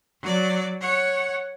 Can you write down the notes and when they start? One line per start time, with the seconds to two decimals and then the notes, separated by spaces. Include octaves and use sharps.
0.21 F#3 D5
0.81 C#5 F#5